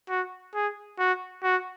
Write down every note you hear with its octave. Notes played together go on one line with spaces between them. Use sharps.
F#4
G#4
F#4
F#4